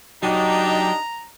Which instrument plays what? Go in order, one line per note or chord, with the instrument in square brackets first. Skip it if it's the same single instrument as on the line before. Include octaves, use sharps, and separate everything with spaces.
[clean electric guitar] F#3 F#4 D#5 [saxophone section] D4 D#4 [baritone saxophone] G4 [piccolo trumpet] A#5